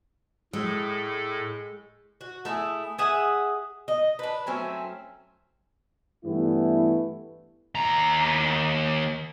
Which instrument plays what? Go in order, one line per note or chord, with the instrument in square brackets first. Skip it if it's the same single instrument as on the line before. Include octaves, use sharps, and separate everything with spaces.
[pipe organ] A2 A4 [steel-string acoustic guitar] G#3
[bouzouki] F#4
A3 E4 F#4 G#4
G#4 E5 F#5
D#5
D4 B4
F#3 A3 C4 C#4
[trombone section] G2 E3 A3 B3 E4
[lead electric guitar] D#2 A#5